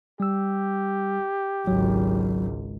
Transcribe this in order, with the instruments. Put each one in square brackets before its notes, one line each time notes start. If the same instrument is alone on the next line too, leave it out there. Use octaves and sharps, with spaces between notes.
[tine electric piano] G3 E6 [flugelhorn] G4
[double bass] G#1 C#2 [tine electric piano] F#3